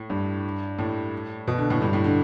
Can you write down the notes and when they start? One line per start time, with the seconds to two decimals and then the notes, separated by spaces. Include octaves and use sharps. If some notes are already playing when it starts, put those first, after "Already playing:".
Already playing: A2
0.10 G2
0.78 A2
1.47 B2
1.58 D3
1.70 A2
1.82 G2
1.93 A2
2.04 D3